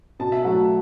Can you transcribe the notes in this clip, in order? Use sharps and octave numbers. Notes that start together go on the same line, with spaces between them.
B2 A5
E5
F#3 A3 F#5